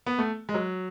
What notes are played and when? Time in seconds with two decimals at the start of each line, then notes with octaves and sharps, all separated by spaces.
0.06 B3
0.19 A3
0.49 G#3
0.54 F#3